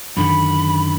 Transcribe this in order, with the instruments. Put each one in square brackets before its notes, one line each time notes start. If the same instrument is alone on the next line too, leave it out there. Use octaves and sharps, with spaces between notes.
[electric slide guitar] F#2 D3 D#3 [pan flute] B5